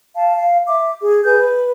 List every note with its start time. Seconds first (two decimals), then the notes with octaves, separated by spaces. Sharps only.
0.16 F5 A5
0.37 F5
0.68 E5 D6
1.02 G#4
1.24 G#4 B4 G#5 G6
1.38 B4